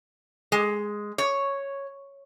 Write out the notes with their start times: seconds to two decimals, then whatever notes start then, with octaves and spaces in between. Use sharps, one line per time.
0.52 G#3
1.18 C#5